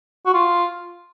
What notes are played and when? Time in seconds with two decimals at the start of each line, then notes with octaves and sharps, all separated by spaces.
0.26 F#4
0.34 F4